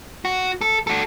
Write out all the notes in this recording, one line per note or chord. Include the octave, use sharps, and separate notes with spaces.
F#4
A4
F#4 A4